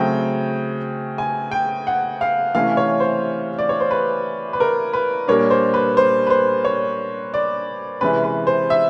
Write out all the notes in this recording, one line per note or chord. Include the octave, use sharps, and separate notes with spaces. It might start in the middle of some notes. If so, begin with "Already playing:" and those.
Already playing: C#3 F#3 A3 C4 G5
G#5
G5
F#5
F5
C3 E3 A3 C#4 F5
C#5
C5
D5
C#5
C5
B4
B4
A#4
B4
A#2 G3 A#3 D4 C#5
C5
B4
C5
B4
C5
C#5
D5
C3 E3 G#3 C#4 B4
B4
C5
E5